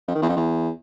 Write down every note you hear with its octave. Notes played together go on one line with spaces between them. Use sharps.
F2
D#3
E2
F2
E2